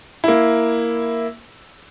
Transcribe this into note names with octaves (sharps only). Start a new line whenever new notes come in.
A#3 E4